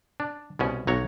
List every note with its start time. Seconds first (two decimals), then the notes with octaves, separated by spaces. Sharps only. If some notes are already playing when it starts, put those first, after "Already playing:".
0.20 D4
0.59 C2 B2 C#4
0.87 B1 F#3 C#5 A#5